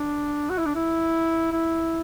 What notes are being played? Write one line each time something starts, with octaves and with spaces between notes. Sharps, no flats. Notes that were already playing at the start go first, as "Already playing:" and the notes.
Already playing: D4
F#4
E4
D4
E4
E4